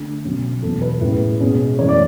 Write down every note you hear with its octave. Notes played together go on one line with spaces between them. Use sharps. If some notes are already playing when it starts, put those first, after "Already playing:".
Already playing: D3 A3 D4
B2 F#3 C#4
E2 B2 F#3 A4
B4
A2 G#3 C#4
B2 G#3 C#4
F#2 E3 A3 C#5
D5